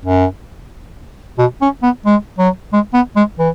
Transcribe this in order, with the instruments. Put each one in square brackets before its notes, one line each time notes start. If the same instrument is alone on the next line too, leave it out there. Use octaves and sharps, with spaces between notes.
[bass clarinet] F#2
B2
C#4
B3
G#3
F#3
G#3
B3
G#3
E3